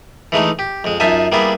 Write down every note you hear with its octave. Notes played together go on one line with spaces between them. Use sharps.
E3 G#3 A3 D#4
G4
F2 G#3
F#2 D#4 F4 E5 G#5 A5
G3 A#3 B3 E4 G#4 D5